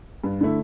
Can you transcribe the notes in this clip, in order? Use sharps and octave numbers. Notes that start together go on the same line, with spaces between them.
G2
D3 A3 E4